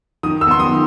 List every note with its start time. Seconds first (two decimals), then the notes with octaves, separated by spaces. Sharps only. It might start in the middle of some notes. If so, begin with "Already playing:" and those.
0.23 D#3 D#6
0.41 E6
0.47 B3 C6
0.60 D#6
0.71 D#3